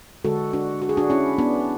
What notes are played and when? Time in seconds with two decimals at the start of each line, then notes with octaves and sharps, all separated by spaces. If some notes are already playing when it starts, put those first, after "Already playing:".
0.24 D3 G#3 F#4 A4
0.53 D4 F#4
0.82 F#4
0.89 G#4
0.97 D4 F#4
1.10 C#4 E4
1.38 B3 D4